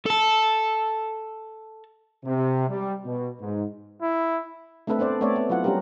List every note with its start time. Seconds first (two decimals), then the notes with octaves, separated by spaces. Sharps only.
0.06 A4 A5
2.24 C3
2.69 G3
3.05 B2
3.40 G#2
4.02 E4
4.87 A3 C4 D4 A4 B4 E5
4.99 B3 D4 C5 D5
5.21 A3 B3 C4 C#5 D5 E5
5.36 B3
5.50 F#3 E4 F4 F#5
5.64 G3 C#4 D4 G4 A#4